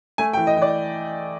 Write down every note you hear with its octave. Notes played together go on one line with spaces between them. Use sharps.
A3 G#5
G5
E3
D#5
E3
D5